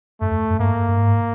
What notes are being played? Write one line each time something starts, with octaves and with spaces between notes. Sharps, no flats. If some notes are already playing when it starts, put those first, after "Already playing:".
F#2 A3
F2
F#2
G2 A#3
G2
G#2